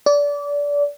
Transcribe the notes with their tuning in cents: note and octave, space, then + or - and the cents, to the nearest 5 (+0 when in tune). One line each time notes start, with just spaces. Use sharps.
D5 -25